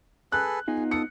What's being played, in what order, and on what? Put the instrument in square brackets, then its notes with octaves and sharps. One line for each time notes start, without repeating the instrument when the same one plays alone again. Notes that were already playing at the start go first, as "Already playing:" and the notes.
[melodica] G#4 A4 B4 [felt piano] F#6
[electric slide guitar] B3 D#4 F4 [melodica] G#4
[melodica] A4 D#6 [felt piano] C#7